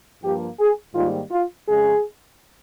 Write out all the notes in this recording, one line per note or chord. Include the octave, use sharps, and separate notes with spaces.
G2 F3 A#3 G4
G#4
G#2 D#3 G3 A#3 F4
F4
F2 C#3 G#3 G#4